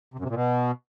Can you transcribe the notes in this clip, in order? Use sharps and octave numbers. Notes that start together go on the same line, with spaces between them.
C3
F#2
C3
A#2
B2